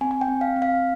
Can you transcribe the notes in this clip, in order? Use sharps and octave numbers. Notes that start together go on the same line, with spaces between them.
C4 G#5
G#5
G5
C4
F5
C4
F5